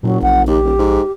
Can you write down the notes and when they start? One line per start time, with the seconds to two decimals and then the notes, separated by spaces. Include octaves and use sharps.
0.03 F#1 A#2 F#3
0.22 A#1 F#5
0.48 D#2 G4
0.64 D#1
0.79 G#2